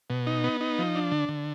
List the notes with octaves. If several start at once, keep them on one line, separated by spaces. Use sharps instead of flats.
B2
D#4
B3
D#4
F3
D4
D3
D3